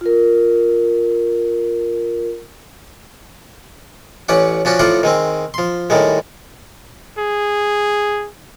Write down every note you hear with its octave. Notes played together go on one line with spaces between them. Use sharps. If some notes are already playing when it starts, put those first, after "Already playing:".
F4 A#4
A1 C#4 D5 F#5
F3 C#4 D4 F#4
A2 F3 F4 D5 F#5 A#5
D#3 G#3 C4
F3 C6
A2 D#3 G3 G#3
G#4